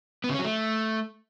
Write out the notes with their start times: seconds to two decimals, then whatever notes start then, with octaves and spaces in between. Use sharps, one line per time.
0.24 B3
0.29 C#3
0.34 C#4
0.39 F#3
0.44 A3